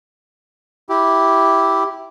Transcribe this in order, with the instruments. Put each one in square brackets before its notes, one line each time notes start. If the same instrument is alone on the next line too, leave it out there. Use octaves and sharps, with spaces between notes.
[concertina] E4 G4